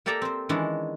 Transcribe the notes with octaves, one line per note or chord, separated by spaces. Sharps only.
A#3 G4 A4 D5 E5 A#5
C4 C5
D#3 E3 G#3 C#4 D4 E4